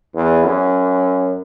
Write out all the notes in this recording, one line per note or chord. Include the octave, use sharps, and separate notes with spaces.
E2
F#2